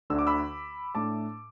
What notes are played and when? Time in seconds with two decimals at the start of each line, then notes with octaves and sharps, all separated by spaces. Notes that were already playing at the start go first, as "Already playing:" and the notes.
0.10 D2 D3 A3 D4 E6
0.19 D6
0.27 B5 E6
0.95 A2 A3 D4 A5 D6